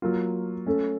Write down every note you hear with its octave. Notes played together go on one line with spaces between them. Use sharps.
F#3 A#3 F4
A3 C#4 A4